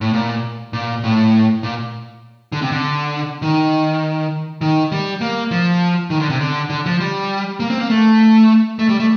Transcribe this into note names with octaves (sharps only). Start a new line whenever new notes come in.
A2
A#2
A#2
A2
A#2
D3
C3
D3
D#3
D#3
G3
A#3
F3
D#3
D3
C3
D3
D3
F3
G3
A#3
C4
A#3
A3
A3
G3
A3